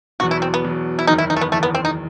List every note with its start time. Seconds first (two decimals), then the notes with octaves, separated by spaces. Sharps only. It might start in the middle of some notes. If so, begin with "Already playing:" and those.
0.20 E2 B2 F#3 F#4
0.31 E4
0.42 C4
0.54 B3
0.64 E2 B2 F#3
0.99 E4
1.07 F#1 E2 D#3 D#4
1.18 E4
1.30 D#4
1.36 A3
1.41 B3
1.52 F#1 E2 D#3 A3
1.63 B3
1.75 C4
1.85 D#4